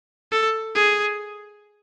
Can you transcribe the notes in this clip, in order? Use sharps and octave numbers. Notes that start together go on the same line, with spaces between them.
A4
G#4